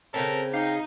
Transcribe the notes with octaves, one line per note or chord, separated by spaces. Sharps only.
C#3 C4 C#4 A4 A#4
D#4 F5 G5